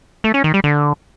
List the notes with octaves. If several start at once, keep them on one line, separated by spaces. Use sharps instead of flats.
A3
C#4
D#3
G3
D3